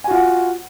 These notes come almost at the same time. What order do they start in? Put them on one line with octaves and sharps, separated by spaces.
G#5 F#4 F4 F#5